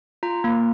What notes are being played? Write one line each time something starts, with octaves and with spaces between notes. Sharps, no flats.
F4 A#5
A#3